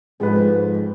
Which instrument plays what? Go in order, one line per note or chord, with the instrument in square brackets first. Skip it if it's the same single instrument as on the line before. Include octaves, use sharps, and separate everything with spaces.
[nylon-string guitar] F2 G#2 F3 [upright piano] G#3 B4